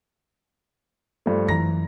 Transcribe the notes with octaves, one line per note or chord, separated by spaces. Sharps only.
G2 F3 A3
F#2 E3 A#5 A#6